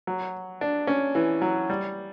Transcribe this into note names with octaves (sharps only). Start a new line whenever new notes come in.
F#3
D4
C#4
E3
F#3
G3